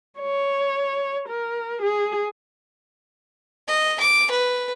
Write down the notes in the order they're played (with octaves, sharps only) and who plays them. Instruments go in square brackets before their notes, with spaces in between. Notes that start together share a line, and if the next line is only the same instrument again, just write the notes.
[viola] C#5
A#4
G#4
[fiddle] D#5
D6
B4